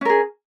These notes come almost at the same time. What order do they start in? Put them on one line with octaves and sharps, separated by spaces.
C#4 A#4 G#4